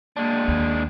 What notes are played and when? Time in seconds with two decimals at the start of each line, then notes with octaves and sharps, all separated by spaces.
0.17 G#3 A#3 D4
0.48 D#2